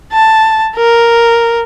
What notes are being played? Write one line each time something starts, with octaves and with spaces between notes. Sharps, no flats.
A5
A#4